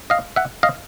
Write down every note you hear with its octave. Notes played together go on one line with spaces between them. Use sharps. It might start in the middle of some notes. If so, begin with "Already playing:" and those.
D#5 F5
E5 F#5
D#5 F5